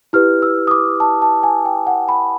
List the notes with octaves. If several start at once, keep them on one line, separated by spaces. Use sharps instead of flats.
E4 G4 B4 F6
E6
D#6
D6
A5
A5
G#5
G5
F#5
B5